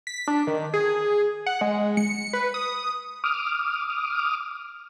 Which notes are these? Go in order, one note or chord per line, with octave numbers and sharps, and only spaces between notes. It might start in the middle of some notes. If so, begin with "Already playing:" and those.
B6
D4
D#3
G#4
F#5
G#3
C#7
B4
D#6
D6 D#6 F6